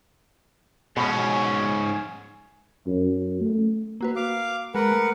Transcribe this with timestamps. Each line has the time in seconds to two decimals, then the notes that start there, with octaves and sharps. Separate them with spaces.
0.97 G#2 B2 C#4
2.87 F#2
3.41 A3
4.01 A#3 F#4 B4
4.16 F5 D6
4.75 G#3 A#4 B4 F#5
4.92 A3